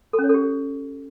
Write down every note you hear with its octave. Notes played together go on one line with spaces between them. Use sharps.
A4
C#4
C#5
A4
G4